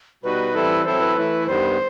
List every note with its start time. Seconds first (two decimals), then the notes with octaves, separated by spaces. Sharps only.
0.23 B2 G3 D#4 F#4 B4
0.54 E3 G3 C4 E4 A4
0.85 F#3 C4 E4 A4 C5
1.00 B4
1.16 E3 A3 E4
1.47 G2 D#3 G3 B3 C5